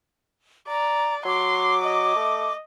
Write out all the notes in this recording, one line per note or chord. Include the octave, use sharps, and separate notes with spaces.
D5 A#5
F#3 C6 D6
D#5
A3